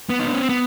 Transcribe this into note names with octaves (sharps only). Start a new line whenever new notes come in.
B3
D#4
D4
C#4
C4
B3